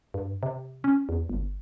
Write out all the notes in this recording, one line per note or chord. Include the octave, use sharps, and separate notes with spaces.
G2
C3
C#4
E2
G1